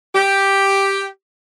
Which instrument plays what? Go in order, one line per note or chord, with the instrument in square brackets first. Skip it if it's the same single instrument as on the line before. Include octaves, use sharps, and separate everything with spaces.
[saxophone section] G4